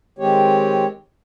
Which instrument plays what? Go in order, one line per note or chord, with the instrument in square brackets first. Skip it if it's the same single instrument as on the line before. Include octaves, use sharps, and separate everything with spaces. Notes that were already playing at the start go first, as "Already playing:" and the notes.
[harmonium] D#3 G#3 C4 G4 C#5